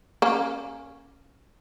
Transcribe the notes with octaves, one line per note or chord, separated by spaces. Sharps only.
A#3 C#4